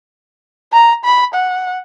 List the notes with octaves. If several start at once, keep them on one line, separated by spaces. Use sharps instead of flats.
A#5
B5
F#5